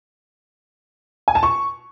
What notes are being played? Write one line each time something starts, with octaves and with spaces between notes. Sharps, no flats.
G#5
A5
C#6